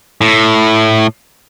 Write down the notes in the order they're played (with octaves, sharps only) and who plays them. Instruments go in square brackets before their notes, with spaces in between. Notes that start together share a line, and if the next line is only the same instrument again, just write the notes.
[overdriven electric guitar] A2